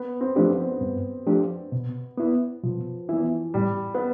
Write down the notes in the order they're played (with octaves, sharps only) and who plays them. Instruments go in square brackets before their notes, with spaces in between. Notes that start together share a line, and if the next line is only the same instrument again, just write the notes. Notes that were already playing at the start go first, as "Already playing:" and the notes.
Already playing: [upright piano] B3
C4
[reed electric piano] F3 A3 D4 G4
[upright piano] B3
C4
B3
[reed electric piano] G2
F3 A3 D4 G4
B2
B3 E4
[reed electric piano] B2 [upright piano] F3
[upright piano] E3 [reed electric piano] B3 E4
[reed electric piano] A2 [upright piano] G3
[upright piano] B3